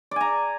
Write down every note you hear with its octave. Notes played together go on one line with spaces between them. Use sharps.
D5 G#5 A#5